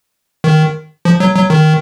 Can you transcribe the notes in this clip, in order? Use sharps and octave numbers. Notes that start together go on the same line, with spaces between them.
D#3
F3
F#3
F#3
D#3